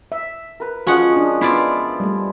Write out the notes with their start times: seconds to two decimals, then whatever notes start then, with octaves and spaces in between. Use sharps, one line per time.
0.12 E5
0.60 A#4 B4
0.87 F3 G#3 C#4 F#4 D#5 F#5
1.16 D4
1.41 B3 E4 F4 D5
2.00 G3 A3